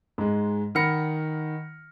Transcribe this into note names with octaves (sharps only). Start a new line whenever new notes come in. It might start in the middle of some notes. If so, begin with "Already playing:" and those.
G#2 G#3
D#3 F#5 B5 F6 A#6 C#7